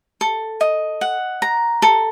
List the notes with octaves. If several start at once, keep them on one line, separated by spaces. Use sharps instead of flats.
A4
D#5
F#5
A#5
A4